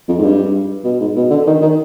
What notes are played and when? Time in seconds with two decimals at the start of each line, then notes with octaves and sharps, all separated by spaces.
0.08 F2
0.19 G#2
0.23 G2
0.85 B2
1.01 G#2
1.16 B2
1.31 D3
1.47 D#3
1.62 D#3